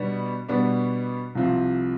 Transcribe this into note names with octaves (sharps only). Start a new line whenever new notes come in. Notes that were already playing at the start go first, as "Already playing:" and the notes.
Already playing: B2 G3 B3 D4
B2 G3 B3 D4
C2 C3 F3 C4